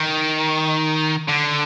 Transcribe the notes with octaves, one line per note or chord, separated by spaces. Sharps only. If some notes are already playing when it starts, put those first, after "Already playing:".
Already playing: D#3
D3